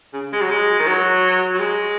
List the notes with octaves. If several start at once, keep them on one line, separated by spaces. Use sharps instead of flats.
C#3
G#3
F#3
G#3
D#3
F#3
F#3
G#3